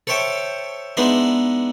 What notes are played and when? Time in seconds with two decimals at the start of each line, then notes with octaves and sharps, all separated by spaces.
0.07 A4 C5 C#5 E5 G5 A5
0.97 G#3 B3 D4 D#4 E5 C6